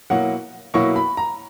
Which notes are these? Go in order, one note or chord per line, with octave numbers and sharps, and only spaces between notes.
B2 F#3 A#3 E4 F#5
B2 F#3 A#3 E4 C#6
B5
A#5